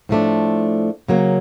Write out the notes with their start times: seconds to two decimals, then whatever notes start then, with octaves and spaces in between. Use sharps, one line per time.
0.09 A2 F3 A3 D4
1.08 C#3 F#3 A#3